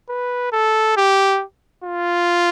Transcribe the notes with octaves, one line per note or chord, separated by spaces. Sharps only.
B4
A4
G4
F4